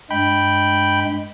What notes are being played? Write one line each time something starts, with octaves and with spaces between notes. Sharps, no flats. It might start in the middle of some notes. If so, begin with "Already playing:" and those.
G2 G#3 G5 B5